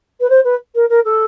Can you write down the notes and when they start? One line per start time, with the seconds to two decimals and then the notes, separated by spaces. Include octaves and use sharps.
0.20 B4
0.29 C5
0.44 B4
0.75 A#4
0.89 A#4
1.04 A4